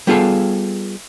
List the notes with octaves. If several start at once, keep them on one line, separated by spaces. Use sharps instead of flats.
G3 B3 F4 G#4 A4 F5